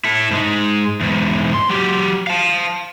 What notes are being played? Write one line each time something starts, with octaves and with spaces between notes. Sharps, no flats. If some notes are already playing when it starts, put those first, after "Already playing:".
E4 A4
G#2 G#3
E2 G#2
C6
F#3 G4
F5 A5